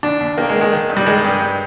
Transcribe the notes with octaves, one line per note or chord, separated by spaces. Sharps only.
D#2 D4
D#2
D#3 A#3
G#3
D#3
G#3
D#3
G2
G3
D#3 G#3
G2
G2